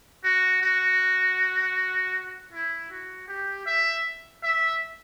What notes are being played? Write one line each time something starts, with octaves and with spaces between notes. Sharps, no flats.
F#4
F#4
E4
F#4
G4
E5
E5